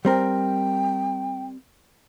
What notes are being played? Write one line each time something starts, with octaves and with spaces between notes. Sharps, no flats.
G3 C4 A#4 G5